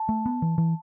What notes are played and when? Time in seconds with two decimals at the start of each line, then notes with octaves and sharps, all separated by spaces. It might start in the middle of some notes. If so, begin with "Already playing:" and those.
Already playing: A5
0.09 A3
0.26 B3
0.42 E3
0.58 E3